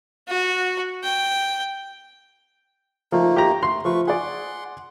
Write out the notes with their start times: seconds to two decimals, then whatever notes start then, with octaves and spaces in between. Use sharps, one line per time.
0.28 F#4
1.04 G5
3.12 F3 A3 A#3 D#4
3.36 G4 A#5
3.63 A3 C6
3.85 F3 A3 B4 C#6
4.07 G#4 D5 F#5 C6